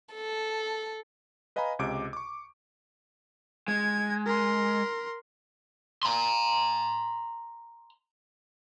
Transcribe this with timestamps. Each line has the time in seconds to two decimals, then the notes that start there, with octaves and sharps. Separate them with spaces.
0.14 A4
1.56 B4 D#5 F5 G#5 A#5 B5
1.79 C#2 C3 D#5 D6 D7
2.13 C#6 D6
3.68 G#3 G#6
4.26 A#4 C6
6.03 A#5 C6